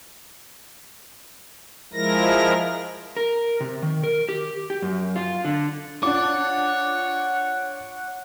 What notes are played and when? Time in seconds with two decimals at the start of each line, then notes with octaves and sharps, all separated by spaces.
1.93 F3 G#3 E4 A#4 A#6
3.17 A#4
3.61 C3
3.83 D#3
4.04 A#4
4.29 G4
4.70 G4
4.82 F#2
5.16 F4
5.45 D3
6.03 D4 F4 C#5 F#5 D6